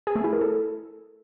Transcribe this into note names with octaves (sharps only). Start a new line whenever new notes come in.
G#4
A3
E4
A#4
A4